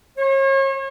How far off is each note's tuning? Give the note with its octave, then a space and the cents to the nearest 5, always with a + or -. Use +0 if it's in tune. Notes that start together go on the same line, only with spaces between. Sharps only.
C#5 -40